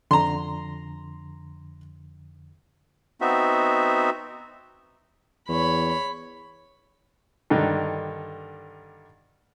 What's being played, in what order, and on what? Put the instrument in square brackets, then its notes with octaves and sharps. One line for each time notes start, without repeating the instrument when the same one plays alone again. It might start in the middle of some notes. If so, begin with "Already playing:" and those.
[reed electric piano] F2 D3 [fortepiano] A#5 C6
[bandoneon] B3 C4 D#4 F#4 E5
[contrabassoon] E2 [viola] C#5 B5
[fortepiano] G2 D3 D#3